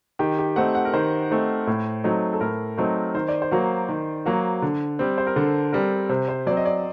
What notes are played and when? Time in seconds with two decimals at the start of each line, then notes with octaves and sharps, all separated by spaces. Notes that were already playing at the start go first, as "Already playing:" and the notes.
0.19 D#3 G4
0.39 G4
0.56 A3 C4 D#4 F#5
0.75 F#5
0.85 A#4
0.93 D#3 C5
1.30 A3 C4 D#4
1.67 A2
2.04 F#3 A3 C4 D#4
2.33 A4
2.41 A2 A#4
2.77 F#3 A3 C4 D#4
3.15 D#3 C5
3.28 D5
3.42 C5
3.51 F#3 A#3 F#4
3.89 D#3
4.26 F#3 A#3 F#4
4.62 D3
4.99 G3 C4
5.18 C5
5.27 A#4
5.36 D3 A4
5.73 G3 C4 A#4
6.09 C3 C5
6.28 C5
6.46 F#3 C4 D5
6.57 D#5
6.65 D5